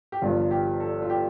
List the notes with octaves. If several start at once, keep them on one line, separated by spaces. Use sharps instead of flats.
G4
G1 G2 F3 F4
G4
A4
F4
G4